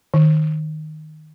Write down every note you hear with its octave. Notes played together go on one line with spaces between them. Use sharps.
D#3